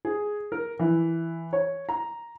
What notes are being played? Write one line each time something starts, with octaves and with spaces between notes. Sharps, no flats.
G#4
A#4
E3
C#5
A#5